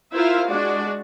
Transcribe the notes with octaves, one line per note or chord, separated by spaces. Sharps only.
E4 F4 A#4 C5 E5 F5
G#3 D4 F#4 D5